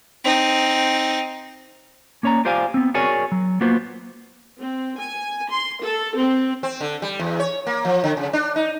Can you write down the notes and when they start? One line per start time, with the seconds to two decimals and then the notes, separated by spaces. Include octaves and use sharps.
0.24 C4 D#4
2.23 A#3 C#4 C#5 D5 A#5
2.45 F4 G4 C5 D5 F5 G#5
2.74 B3 C4
2.94 F#4 G#4 A#4 C#5 D5 G#5
3.32 F#3
3.61 A#3 B3 F4 F#4 C5
4.58 C4
4.98 G#5
5.50 C6
5.82 A4
6.17 C4
6.63 C4
6.81 D3
7.02 G3
7.19 E2
7.40 C#5
7.67 A#3
7.85 F3
8.04 D3
8.17 C#3
8.33 D4
8.56 D#4